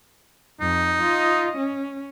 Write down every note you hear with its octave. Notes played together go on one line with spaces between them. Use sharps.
F2 D#4
F4 D#5
C#4